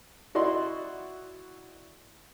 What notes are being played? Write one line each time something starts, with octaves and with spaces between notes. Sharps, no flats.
E4 F#4 D5 D#5 C6